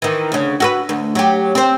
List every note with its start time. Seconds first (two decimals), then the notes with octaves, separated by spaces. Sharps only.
0.02 D#3 E3
0.32 D2 C#3
0.60 F#4 A4 B4
0.89 D2
1.15 F#3 G4
1.55 C4 C5